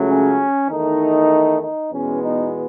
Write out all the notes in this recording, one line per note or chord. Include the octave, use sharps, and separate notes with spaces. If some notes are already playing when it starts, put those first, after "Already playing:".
Already playing: C#2 C#3 F#3 A3
C#4
E2 D#3 A3 D#4
D#4
E2 B2 G#3 B3 C#4
D#4